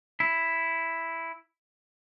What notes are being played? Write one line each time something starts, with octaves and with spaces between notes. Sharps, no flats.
E4